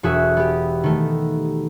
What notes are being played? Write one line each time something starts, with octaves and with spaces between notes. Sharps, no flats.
E1 F#4 G#4 E5
B3 G4
D#3 A3